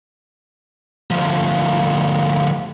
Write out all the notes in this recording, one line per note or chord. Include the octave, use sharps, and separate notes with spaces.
D2 F3